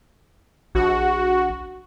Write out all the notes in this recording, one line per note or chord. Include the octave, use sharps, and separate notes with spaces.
A#1 F#4